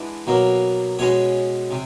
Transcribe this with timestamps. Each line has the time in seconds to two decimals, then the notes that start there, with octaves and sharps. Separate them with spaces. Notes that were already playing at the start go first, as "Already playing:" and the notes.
Already playing: E3 G#3 B3 D4
0.27 B2 F#3 A#3
0.99 B2 G#3 C#4 C#5
1.71 C3